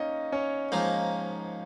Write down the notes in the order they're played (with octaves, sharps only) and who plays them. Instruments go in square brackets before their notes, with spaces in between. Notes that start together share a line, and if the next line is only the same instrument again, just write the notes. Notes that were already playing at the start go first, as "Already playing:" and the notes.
Already playing: [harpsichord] A#3 [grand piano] C#4 D#4 C#5 D#5
[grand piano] C#4 C#5
[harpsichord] G#2 F3 A#3